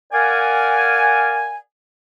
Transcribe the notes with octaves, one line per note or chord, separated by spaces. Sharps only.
A#4 D5 F5 F#5 G#5